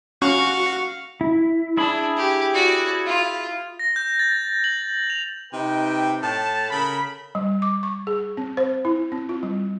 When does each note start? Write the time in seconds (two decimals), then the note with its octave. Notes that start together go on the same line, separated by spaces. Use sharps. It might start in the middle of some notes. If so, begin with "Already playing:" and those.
0.22 C#4 F#4 F5 C#6
1.21 E4
1.77 D4 E4 G#4 B5
2.17 G4
2.53 F#4 D5
3.06 F4
3.79 A#6
3.96 G6
4.19 A6
4.64 F#7
5.10 F7
5.53 C3 D#4 B4 G5
6.22 A2 A3 A5
6.71 C#3 A4 A#4 B5
7.35 G3
7.62 D6
7.83 C#6
8.07 G#4
8.37 C4
8.57 C5
8.85 E4
9.12 C4
9.29 F4
9.43 G3